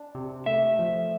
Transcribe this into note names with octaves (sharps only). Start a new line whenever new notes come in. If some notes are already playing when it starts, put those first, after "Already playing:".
Already playing: D4
C3
A3 E5
F3